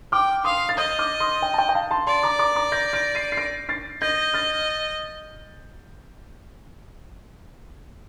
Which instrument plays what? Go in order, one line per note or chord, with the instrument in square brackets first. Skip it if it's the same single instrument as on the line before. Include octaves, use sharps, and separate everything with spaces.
[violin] G5 [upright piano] D6 F6
[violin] F5 [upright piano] C6 D#6
[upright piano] A6
[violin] D#5 [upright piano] D#6 G6
[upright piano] D6 F6
C6 D#6
G5
A5
G5
G5
F5 A5
A5 C6
[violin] D5 [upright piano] A5 C6
[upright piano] A#5 D6
A#5 D6
A#5 D6
G6 A#6
A#6 D7
C7 D#7
C7
A#6 D7
A6 C7
[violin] D#5 [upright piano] G6 A#6
[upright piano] F6 A6